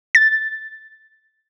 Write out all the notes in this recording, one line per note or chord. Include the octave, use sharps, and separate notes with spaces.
A6